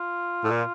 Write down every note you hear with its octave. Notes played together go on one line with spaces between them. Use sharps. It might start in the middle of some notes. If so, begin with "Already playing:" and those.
Already playing: F4
A2
A#2